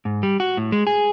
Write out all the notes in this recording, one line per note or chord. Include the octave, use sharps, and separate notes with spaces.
G#2
G3
F#4
A2
G#3
G#4